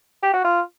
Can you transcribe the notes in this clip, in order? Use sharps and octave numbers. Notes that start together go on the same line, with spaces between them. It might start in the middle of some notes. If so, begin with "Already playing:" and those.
G4
F#4
F4